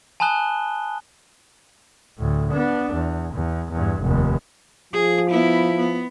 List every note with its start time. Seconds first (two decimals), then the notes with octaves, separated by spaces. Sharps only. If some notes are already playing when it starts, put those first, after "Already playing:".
0.20 G#5 A5 B5 D#6 F#6 G7
2.18 D2 A2
2.52 B3 D4
2.94 E2
3.34 E2
3.72 E2 G2
4.02 F1 D#2
4.93 F3 G#4
5.30 B3 E4
5.77 B3